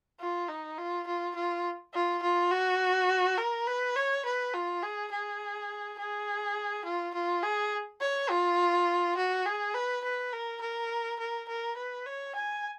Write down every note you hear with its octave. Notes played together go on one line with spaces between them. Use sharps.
F4
D#4
F4
F4
F4
F4
F4
F#4
A#4
B4
C#5
B4
F4
G#4
G#4
G#4
F4
F4
G#4
C#5
F4
F#4
G#4
B4
B4
A#4
A#4
A#4
A#4
B4
C#5
G#5